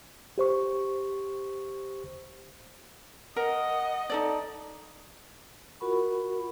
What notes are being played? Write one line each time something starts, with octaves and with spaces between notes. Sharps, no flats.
G4 C5 C#6
A#4 D#5 F#5
D#4 A4 D5
F4 F#4 A#4 F#5 B5 C#6